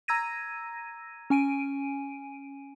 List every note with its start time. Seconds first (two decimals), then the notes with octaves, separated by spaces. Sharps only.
0.08 A#5 E6 G#6 A#6 D#7
1.30 C#4 G#5 D7 D#7